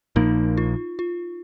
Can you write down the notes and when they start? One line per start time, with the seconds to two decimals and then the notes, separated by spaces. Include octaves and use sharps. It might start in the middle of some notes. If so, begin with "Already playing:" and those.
0.16 A#1 A#2 F3 A#3 D#4
0.58 F4
0.99 F4